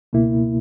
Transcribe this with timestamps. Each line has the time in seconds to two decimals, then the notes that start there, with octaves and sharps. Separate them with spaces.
0.13 C#2 B2 A#3 E4